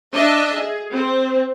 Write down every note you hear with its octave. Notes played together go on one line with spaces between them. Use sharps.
D4 D#5 E5
G#4
C4